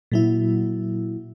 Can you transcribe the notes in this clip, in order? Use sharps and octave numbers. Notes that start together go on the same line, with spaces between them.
A#2 F#3 E4